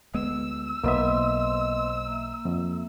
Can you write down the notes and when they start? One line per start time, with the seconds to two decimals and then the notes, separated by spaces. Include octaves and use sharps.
0.14 D2 G#3 B3 E6
0.84 B1 B2 A#3 B3 C5 D#5 E5 C6
2.06 A#3 E5
2.45 F2